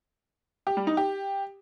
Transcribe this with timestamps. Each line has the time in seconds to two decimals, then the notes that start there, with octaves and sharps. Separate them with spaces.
0.67 G4
0.77 G3
0.87 D#4
0.97 G4